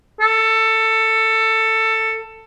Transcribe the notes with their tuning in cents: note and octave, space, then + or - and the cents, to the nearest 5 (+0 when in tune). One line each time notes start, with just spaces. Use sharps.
A4 +15